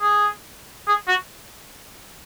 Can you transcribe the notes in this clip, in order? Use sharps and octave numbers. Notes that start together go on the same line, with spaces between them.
G#4
G#4
F#4